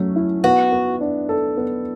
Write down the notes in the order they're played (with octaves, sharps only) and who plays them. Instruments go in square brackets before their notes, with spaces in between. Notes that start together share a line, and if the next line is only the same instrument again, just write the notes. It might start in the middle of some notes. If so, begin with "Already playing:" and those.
Already playing: [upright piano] F#3 A3 C#4
E4
[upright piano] B3 [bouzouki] F#4
[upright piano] B3
D4
A4
B3